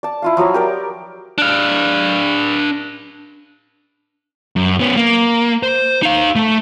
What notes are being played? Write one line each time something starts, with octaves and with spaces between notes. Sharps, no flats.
D5 A5
E4 F4 F5
F3 F#3 C#5 A#5
G4 A#4 D5
D4 F5
F#2
B3 C#4
A#3
C5
D#4 F5
A3 A4